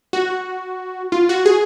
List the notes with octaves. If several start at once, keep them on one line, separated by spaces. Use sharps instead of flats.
F#4
F4
F#4
G#4